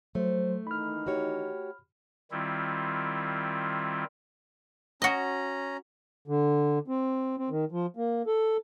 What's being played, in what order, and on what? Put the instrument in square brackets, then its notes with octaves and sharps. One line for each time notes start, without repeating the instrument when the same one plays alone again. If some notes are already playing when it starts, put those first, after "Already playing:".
[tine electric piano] F#3 [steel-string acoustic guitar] A3 [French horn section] C5
[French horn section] D#3 E3 D#4 [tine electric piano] B5 F6
[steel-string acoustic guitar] F#4 G4 C#5
[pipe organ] D#3 G3 C4 E4 F4
[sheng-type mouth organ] C#4 A#5 [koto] F#4 D#5
[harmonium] D3
C4
C4
D#3
F3
A#3
A4